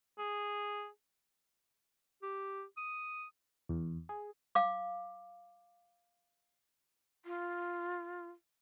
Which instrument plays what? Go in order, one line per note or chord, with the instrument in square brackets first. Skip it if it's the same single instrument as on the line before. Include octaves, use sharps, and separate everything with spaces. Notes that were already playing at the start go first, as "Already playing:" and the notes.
[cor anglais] G#4
[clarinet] G4
D#6
[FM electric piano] E2
G#4
[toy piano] F5 D6
[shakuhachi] F4